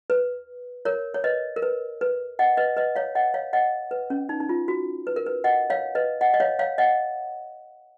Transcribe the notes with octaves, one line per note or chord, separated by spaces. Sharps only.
B4
A#4 C#5
C#5
B4 D#5
A#4
B4
B4
D#5 F#5
B4 D#5
B4 D#5
C#5 F5
D#5 F#5
C#5 F5
D#5 F#5
B4
C#4
D#4
D#4
F4
F#4
B4
A#4
B4
D#5 F#5
C#5 F5
B4 D#5
D#5 F#5
D#5
C#5 F5
C#5 F5
D#5 F#5